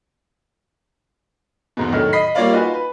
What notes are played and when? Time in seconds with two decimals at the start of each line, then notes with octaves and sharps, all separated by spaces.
1.77 E2 G#2 B2
1.92 A2 D3 D#3 F#3 A3
2.13 D#5 B5 B6 C7
2.35 G3 A#3 F4 C#5 D5 F5
2.53 D#4 F4 F#4 B4 G#5
2.74 B4